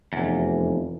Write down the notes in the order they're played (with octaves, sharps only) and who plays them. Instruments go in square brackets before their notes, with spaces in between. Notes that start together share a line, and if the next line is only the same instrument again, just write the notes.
[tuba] F1 [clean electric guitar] E2